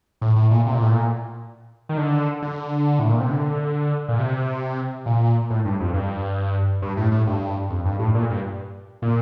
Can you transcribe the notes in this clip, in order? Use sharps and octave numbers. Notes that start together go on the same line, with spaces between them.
A2
A2
A#2
C3
A#2
A2
A#2
D#3
D3
D3
A2
A#2
C3
D3
A#2
C3
A#2
A2
G2
F2
G2
G2
A2
A2
G2
F2
G2
A2
A#2
G2
A#2